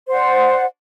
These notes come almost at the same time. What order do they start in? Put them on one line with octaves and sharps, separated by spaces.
C5 F#5 D5